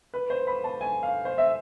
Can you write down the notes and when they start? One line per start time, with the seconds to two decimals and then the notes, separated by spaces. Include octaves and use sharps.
0.14 B4
0.30 C5
0.47 B5
0.64 A5
0.81 G#5
1.03 F5
1.25 C5
1.38 E5